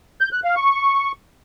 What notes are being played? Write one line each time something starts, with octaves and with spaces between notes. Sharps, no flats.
G6
F#6
F5
C#6